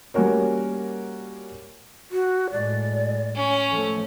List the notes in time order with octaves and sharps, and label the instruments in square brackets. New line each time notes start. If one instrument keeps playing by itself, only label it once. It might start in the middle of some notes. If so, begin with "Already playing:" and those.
[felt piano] G3 A#3 C#4 F#4 A#4 C#5
[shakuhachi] F#4
[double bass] A2 G#3 [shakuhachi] D5
[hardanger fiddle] C#4 [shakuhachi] G#5
[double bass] F3 A3 [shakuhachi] A4